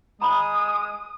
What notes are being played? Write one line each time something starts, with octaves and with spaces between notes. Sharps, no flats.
G#3 A#5 B5 D#6